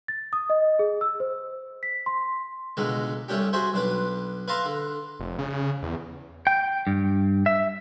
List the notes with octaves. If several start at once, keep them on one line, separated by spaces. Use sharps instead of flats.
A6
D#6
D#5
G#4
E6
C5
B6
C6
C#2 B2 D3 G#3 D#4
C2 A3 C#4 D4 G4
F#4 G#4 A4 C5 E5
B1 D4 B4
B4 E5 F5 A5 A#5 C6
D3
F1
C#3
E2
G5
G2
E5